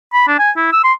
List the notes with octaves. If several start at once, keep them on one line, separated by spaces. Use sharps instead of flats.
B5
D4
G#5
E4
E6
C6